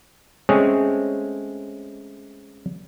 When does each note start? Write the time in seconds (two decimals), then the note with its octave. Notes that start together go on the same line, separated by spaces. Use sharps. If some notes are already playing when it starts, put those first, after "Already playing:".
0.49 G#3 A3 C4 C#4 G#4 C#5